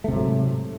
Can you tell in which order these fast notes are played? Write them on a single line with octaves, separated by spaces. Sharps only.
A3 C3 G#2 F#3